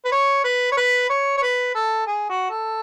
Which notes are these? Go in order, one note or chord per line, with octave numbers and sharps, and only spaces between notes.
B4
C#5
B4
C#5
B4
C#5
C#5
B4
A4
G#4
F#4
A4